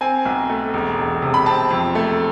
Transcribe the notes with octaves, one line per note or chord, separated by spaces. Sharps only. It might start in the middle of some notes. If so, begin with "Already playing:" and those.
C4 G#5
B1
A3
E1
E1
C3
B5
C4 A5
F2
A3